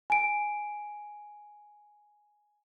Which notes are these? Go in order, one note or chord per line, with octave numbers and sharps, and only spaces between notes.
G#5 D7